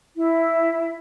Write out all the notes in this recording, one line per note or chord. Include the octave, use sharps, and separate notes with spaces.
E4